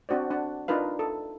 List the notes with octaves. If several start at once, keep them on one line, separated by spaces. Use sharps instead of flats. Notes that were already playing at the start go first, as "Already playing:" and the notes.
C4 D4 F#4 C5 D5
D4 F#5
D4 D#4 F4 A#4 B4 F5
A4